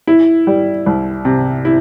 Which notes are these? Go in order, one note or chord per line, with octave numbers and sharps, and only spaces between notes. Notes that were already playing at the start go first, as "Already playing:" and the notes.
E4
G3
C2
C3
E4